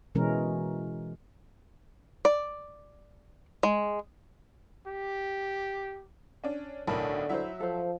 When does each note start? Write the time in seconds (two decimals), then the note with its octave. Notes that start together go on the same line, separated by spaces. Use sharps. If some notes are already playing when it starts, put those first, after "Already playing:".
0.15 B2 E3 G#3 C#4 A#4
2.25 D5
3.63 G#3
4.86 G4
6.44 C#4 D4
6.87 B1 A2 D3 A#4 A5 B5
7.29 F#3 E4 C5 E5
7.60 F3 A4 C5